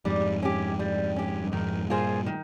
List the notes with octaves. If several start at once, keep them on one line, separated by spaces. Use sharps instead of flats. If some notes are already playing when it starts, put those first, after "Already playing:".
F2 G#2 G3
C#4 G4
G3
C#4 G4
G2
F2 G#2 D#3
G2 A#2 A#3 F4 G#4 C5
D#3